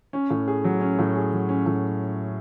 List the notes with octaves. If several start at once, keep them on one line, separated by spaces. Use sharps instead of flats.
C#4
A2
G#4
F#3
C#4
A2
G#4
F#3
C#4
A2